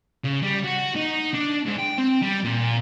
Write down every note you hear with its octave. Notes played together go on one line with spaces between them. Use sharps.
C#3
G3
F#4
D#4
D4
G#2
G5
C4
G3
A#2